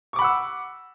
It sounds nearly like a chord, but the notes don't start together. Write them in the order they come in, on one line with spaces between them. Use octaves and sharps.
C#6 D6 B5 F#5 E6